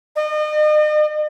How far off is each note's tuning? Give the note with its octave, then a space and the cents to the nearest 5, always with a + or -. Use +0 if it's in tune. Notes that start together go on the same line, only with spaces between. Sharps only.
D#5 -40